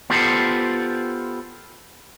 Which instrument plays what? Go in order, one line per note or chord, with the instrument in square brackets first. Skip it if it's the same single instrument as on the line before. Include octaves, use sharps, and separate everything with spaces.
[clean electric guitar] B3 F4 G4 A4 C5